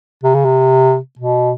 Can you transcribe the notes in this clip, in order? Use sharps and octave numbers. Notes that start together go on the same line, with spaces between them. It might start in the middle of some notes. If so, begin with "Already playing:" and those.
C3
C#3
C3
B2